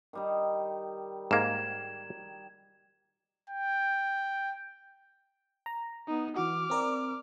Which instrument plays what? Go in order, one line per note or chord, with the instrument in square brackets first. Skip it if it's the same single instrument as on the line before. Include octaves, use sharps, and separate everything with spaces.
[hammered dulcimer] D#3 G3 D#4
[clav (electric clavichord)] G#2 A#3 [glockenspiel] G#6 E7
[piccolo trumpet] G5
[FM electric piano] A#5
[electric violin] B3 D#4
[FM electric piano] E3 F#4 [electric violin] D6 F6
[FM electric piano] C4 A#4 D5